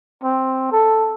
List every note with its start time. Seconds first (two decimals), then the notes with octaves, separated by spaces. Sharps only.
0.23 C4
0.71 A4